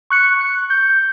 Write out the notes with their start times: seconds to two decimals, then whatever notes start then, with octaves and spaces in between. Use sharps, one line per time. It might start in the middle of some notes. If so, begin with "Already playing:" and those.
0.10 C#6 F#6 C#7
0.70 G6